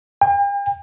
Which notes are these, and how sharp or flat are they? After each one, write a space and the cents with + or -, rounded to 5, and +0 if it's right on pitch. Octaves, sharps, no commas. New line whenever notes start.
G5 +45